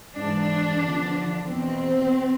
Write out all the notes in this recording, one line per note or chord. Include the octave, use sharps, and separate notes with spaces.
G#2 E3 D4
E2 D3 F3
E2 B2 C4